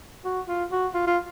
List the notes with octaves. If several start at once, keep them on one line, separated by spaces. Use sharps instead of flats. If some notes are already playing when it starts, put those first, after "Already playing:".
F#4
F4
F#4
F4
F4